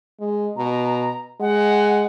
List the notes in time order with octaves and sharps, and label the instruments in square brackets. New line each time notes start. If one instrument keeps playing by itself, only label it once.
[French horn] G#3
[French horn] B2 [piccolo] A#5
[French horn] G#3 [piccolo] F#5